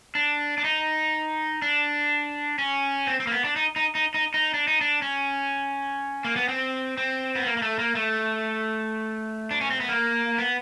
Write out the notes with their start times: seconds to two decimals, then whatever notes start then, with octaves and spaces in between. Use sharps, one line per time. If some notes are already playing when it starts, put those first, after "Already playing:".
0.15 D4
0.58 D4
0.64 D#4
1.62 D4
2.59 C#4
3.07 C4
3.20 C4
3.27 A#3
3.32 B3
3.44 D4
3.56 D#4
3.76 D#4
3.95 D#4
4.14 D#4
4.34 D#4
4.54 D4
4.68 D#4
4.81 D4
5.02 C#4
6.24 A#3
6.36 B3
6.49 C4
6.97 C4
7.35 B3
7.46 A#3
7.57 A#3
7.62 A3
7.79 A#3
7.95 A3
9.51 D4
9.61 C#4
9.70 C4
9.80 B3
9.89 A#3
10.38 B3